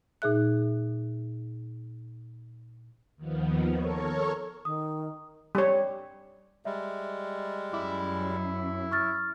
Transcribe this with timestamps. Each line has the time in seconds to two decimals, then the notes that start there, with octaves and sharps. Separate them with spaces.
0.22 A#2 D#4 G#4 E5 F#6
3.16 D#2 D#3 F3 B3
3.74 A4 A#4 C#5 C#6
4.65 D#3 D#6
5.55 G3 C#5
6.65 G3 G#3 E5
7.73 F#2 E4 D6
8.91 C#6 F6 A6